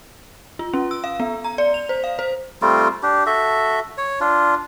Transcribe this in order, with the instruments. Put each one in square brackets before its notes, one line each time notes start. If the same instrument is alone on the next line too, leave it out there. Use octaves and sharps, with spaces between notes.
[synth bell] F4
C#4
E6
F5
B3
A#5
D5
F7
C5
F5
C5
[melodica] G3 A3 C4 F4
D4 G4
F#4 A4 E5
C#5
D4 F4